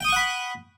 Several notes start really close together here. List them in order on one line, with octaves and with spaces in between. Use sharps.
G5 D#6 C#6 F#5 B5